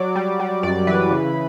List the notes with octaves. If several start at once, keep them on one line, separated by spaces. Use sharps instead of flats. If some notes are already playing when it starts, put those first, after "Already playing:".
Already playing: F#3 D5
G3
G3
F#2 D5
E3 B4
C#3